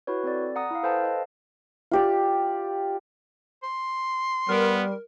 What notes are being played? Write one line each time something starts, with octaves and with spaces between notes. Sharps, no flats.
E4 F#4 B4 C#5
C4 A4 D5
F#5 A#5 D#6
E4 F5
A4 B4 C5 F5 G5 A5
D#5 F5
F4 G4 D5
C6
G3 B3 A#4